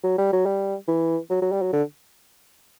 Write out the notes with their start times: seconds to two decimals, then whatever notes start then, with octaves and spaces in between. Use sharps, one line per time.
0.04 F#3
0.18 G3
0.32 F#3
0.46 G3
0.88 E3
1.30 F#3
1.42 F#3
1.52 G3
1.62 F#3
1.73 D3